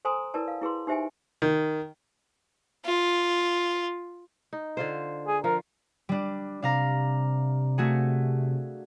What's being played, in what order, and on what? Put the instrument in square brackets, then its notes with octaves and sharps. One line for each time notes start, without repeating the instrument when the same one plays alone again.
[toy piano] A4 C5 G#5 A#5 C6 D#6
E4 A#4 B4 D5 A5
F5
E4 G#4 B4 C6
D#4 G4 C5 E5 G5 G#5
[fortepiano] D#3
[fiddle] F4
[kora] D#4
D3 F4 C5
[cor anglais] G#4
[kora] F3 [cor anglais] A#4
[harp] G3 D4
[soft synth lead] C3 [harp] D4 F5 A#5
[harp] A3 F#4 G#4